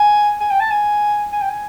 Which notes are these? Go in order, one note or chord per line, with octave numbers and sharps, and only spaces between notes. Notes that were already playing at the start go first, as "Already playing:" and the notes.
Already playing: G#5
G#5
G5
A5
G#5
G#5
G5
G#5